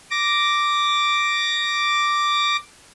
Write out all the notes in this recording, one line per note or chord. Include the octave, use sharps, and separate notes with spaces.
D6 A#6